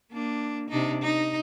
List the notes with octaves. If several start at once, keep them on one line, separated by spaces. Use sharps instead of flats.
A#3 D4
C3 D4 D#4
D#4